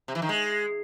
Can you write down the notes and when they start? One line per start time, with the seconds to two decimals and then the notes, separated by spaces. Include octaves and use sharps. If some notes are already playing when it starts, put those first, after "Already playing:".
0.08 C3
0.15 E3
0.22 D#3
0.29 G#3